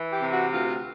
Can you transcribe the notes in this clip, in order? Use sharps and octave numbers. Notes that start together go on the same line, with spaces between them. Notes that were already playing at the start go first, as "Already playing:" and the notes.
Already playing: E3
G4
C3
F#4
D2 F4